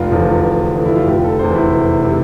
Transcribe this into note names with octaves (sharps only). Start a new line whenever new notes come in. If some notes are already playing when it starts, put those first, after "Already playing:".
Already playing: F1 F4
E2 D3 F3
F1
E2 D3 F3
E4
F4
F1 G4
A4
E2 C3 C5
E4
F1
C3